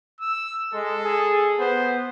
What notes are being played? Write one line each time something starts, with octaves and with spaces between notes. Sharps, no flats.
E6
G#3 A4
G#4
B3 C5